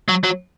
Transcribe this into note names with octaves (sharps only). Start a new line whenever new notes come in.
F#3
F#3